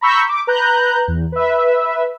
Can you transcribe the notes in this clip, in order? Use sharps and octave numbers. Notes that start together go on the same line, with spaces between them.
A#5 B5 C#6 E6 G6 B6
D6
B4 A#5 F#6 G6
E2
B4 E5